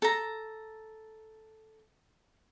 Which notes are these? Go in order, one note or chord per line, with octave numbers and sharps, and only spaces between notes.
A4 A#5